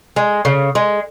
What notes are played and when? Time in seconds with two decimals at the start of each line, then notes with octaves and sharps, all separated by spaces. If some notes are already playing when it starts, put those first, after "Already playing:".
0.16 G#3
0.45 C#3
0.75 G#3